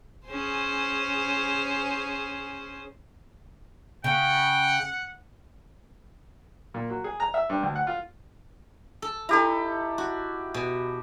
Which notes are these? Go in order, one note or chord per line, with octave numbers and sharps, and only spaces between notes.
C#4 G#4 C5
C#3 F#5 G5
A#2
F#3
G#4
A#5
E5
G2
D2
F#5
F4
A4
D#4 E4 G4 A4 A#5
F#4
B2